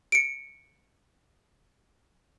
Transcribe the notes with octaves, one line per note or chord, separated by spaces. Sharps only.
C#7 D7